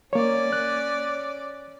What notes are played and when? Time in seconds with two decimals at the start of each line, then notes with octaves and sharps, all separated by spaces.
0.13 A#3 C#4 C#5 D5
0.53 F#6